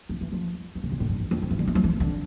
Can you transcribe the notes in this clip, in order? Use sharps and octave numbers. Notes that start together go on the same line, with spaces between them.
F3
E3
F3
E3
C#3
A#2
A2
G2
E2
F2
A2
E3
D3
E3
F3
E3
D3